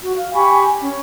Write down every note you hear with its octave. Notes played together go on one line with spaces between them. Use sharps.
F#4
F5
G4 G#5 B5 C#6
C#4